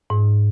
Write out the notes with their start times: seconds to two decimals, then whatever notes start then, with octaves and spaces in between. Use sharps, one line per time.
0.10 G#2